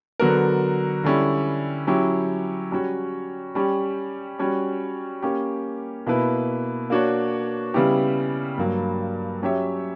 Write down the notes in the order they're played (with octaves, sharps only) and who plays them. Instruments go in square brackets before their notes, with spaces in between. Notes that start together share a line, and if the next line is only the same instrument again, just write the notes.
[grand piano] D3 F#3 B3 F#4 A#4
D3 G3 C#4 E4
F#3 C#4 E4 G4
G3 C#4 F#4 C#5
G3 C#4 G4
G3 C#4 F#4 C#5
A#3 C#4 G4
B2 A#3 E4 B4
A#3 D4 F#4 C#5
C#3 G3 B3 E4 G4
G2 F#3 A#3
F#3 C#4 G4 C#5 E5